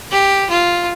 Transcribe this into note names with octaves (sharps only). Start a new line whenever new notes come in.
G4
F4